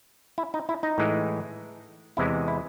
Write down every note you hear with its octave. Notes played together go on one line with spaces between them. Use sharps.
E4
D#4
E4
D#4
A2 E3 G#3
E2 C3 E3 G#3 E4
E4